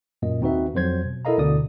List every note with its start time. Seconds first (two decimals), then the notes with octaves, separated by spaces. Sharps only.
0.22 F#2 A#2 A#3 D#5
0.41 D#2 C4 D#4 F#4 B4 E5
0.74 F2 F#3 C5 G#6
1.05 B2
1.25 E4 A4 A#4 D#5 F5 A#5
1.38 D2 B2 D3 D5 D#6